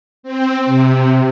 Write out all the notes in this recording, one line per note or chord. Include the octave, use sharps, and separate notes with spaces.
C4
C3